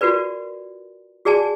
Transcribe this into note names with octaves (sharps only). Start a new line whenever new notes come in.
F4 F#4 A#4 B4 D5
F#4 G#4 D5 G#5 A5